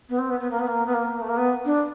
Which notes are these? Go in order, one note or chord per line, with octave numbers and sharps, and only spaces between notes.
B3
C4
B3
B3
A#3
B3
A#3
B3
A#3
A3
A#3
B3
D4